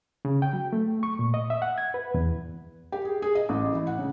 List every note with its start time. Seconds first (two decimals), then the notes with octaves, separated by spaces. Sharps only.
0.25 C#3
0.42 G5
0.53 F#3
0.73 A3
1.03 C#6
1.19 A#2
1.34 D#5
1.50 E5
1.62 F#5
1.78 G#6
1.94 B4
2.14 E2
2.92 G4
3.05 G#4
3.22 G#4
3.35 D#5
3.49 A1
3.72 E3
3.87 F#5
3.99 C#3